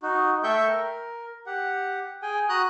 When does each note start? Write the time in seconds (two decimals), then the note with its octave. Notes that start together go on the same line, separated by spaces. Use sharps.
0.03 D#4 F#4
0.43 A3 A4 E5 G5 C#6 G6
0.67 A#4
1.46 G4 F#5
2.22 G#4 G5 G#5
2.49 F#4 A#5 D#6 F#6